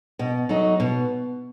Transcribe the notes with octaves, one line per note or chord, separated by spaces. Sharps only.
B2
F#3 A3 D#4
B2